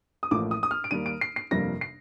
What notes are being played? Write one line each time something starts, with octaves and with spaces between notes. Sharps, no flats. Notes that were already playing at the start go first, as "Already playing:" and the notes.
D#6
A1 A2 F3 A#3 D6
D#6
D#6
F6
D7
D#2 D#3 G3 A#3 D#7
D7
C7
C7
G1 F2 C3 G3 A#3 A#6
C7